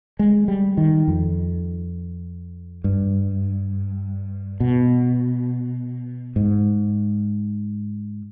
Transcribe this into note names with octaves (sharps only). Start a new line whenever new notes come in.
G#3
G3
D#3
F2
G2
B2
G#2